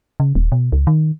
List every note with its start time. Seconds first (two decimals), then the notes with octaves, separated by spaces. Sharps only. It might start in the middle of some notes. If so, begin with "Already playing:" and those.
0.20 C#3
0.35 D#1
0.52 B2
0.72 C#2
0.87 D#3